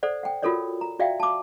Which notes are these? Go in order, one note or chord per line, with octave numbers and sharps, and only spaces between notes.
A4 C5 D5 F#5
F#5 G5
F4 F#4 A4 A#4 C#5 D5
A#5
F#4 D5 E5 F5 G5
A5 D6